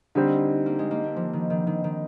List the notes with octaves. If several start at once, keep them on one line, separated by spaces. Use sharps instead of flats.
D3 G3 C4 D#4
A#3
G#3
A#3
D4
F3
D#3
D#3
D#3
D#3